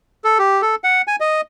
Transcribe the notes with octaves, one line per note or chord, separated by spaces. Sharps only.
A4
G4
A4
F#5
G#5
D#5